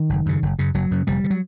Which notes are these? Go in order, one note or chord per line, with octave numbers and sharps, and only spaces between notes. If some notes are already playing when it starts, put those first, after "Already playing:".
Already playing: D#3
F#1
F#2 C#3
F#1
F#2 C#3
F#1 F#3
F#2 C#3
F1 G3
D3
F#3